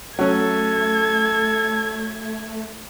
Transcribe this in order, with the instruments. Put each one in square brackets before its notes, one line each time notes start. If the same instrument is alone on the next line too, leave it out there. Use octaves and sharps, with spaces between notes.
[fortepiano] F#3 C#4 [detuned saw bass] A3 [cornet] A4 [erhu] G#6